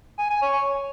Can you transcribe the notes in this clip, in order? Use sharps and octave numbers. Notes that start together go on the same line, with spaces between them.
G#5
G#5
C#5